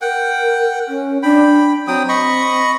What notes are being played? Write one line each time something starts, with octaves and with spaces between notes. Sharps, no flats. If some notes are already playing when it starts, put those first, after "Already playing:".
A#4 F#5 G5
C#4
D4 G5 B5
F#3 C4 G5 D#6
D#5 B5 C#6